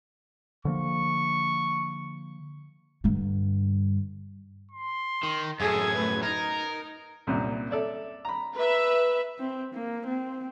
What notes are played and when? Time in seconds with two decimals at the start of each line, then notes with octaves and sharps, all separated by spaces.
0.65 D3 F3 A#3 C#6
3.04 G2 D3
4.72 C6
5.23 D#3
5.60 F#2 A2 G#4 A4 G#6
5.93 A3 B4
6.23 D#4 A#4 G#6
7.27 C2 F#2 A#2
7.71 A4 D5 E5
8.25 A#5 B5
8.55 B4 E5
9.39 C4
9.75 A#3
10.07 C4